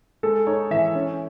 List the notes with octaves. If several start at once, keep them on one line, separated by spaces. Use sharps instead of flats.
G#3 A4
D#4 C#5
E3 E5
C#4